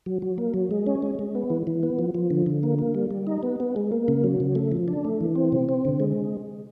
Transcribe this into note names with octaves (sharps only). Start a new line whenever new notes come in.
F#3
F#3
A#3
F#3
G#3
C#4
G#3
G#3
B3
E3
E3
B3
F3
F3
D3
D3
A#3
A#3
G3
G3
D#4
B3
B3
G#3
A#3
C#3
F#3
C#3
A3
F3
D4
A3
E3
C4
C3
C4
D3
G#3